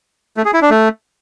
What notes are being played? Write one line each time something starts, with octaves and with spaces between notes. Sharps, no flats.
A3
G#4
E4
D4
A3